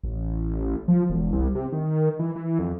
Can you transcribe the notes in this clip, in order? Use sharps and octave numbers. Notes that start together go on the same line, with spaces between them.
A1
F3
E1
C2
C3
D#3
E3
E3
F2